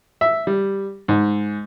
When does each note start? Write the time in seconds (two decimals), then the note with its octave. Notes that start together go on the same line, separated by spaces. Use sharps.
0.21 E5
0.47 G3
1.08 G#2